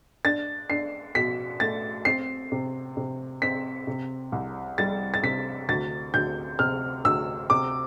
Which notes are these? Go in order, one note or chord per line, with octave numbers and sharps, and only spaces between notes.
D4 A6
D4 C7
B2 B6
A3 A6
C4 C7
C3
C3
C4 B6
C3
C2
G3 A6
A6
C3 B6
D2 A6
D2 G6
C3 F6
D2 E6
C3 D6